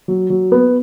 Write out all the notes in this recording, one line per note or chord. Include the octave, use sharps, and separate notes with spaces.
F#3
F#3
B3